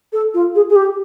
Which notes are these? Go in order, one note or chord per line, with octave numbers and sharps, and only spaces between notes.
A4
F4
G#4
G#4
G4